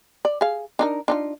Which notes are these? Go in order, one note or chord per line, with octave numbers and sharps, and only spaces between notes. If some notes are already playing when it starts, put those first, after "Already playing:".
D5
G#4 F5
D4 D#4 A#4
D4 D#4 F4